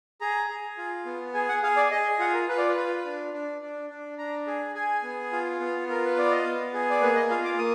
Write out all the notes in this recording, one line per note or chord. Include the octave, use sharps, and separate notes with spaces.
G#4 A#5
G#4
F4
B3
G#4 G#5
F#5
G#4 F5
D5
G#4 D#5
F4 F#5
A#4
F4 B4
D5
B4
F4
D4
D4
D4
D4
D4 A#5
G#4
G#4 G#5
B3
F4
B3
F4 A#4
B4
B3 D5
D#5
B3 F5
G#4
D5
A#3 B4
D#5
F4 F5
D6
A#3 D#6